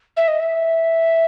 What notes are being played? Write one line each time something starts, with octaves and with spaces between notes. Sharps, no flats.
E5
D#5
E5